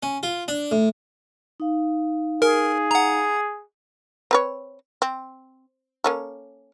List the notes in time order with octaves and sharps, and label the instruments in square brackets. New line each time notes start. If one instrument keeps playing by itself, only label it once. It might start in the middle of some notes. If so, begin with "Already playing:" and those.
[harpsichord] C#4
F4
D4
A2
[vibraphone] D#4 F5
[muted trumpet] G#4 [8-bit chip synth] A#4
[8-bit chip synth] F#5 A#5
[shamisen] C4 B4 C#5
C4
A#3 C#4 A4